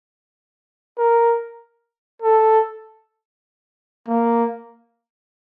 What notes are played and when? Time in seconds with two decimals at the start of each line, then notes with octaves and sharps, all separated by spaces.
0.98 A#4
2.22 A4
4.08 A#3